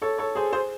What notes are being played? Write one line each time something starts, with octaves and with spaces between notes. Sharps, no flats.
A4 C#5
A4 C#5
G#4 C5
G#4 C5